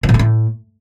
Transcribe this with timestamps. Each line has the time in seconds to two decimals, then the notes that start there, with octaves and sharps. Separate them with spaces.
0.03 F3
0.09 A#2
0.14 A3
0.19 A2